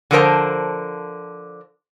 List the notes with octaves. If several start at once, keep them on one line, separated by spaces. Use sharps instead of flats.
D3 F3 A4 A#4 C5 A5